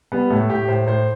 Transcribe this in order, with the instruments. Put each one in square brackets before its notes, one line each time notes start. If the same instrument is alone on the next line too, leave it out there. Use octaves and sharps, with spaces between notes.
[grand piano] G3 B3
A2 A3
A2 G4
A2 C5
A2 C5